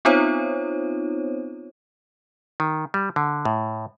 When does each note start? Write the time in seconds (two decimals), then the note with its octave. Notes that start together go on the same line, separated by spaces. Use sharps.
0.05 B3 C4 D#4 F4 C5 C#5
2.60 D#3
2.94 G3
3.16 D3
3.45 A2